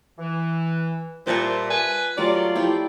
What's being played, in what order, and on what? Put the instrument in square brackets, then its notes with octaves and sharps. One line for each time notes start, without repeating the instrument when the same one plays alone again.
[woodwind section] E3
[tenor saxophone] A#2 [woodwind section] G3 E5 [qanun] F4 A5 C#6 [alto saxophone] C5
[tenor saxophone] B4 [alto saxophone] G#5
[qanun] F#3 A3 A#4 [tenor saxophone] G3 [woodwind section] F4 [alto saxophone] D5
[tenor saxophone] F3 [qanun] E4 D5 G5 [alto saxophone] G4